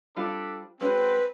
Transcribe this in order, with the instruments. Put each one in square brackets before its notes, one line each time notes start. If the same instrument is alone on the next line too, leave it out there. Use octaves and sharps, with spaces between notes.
[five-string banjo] G3 C4 F4 [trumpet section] D4 A4 B5
[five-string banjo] G#3 C#4 F#4 [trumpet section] C4 [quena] B4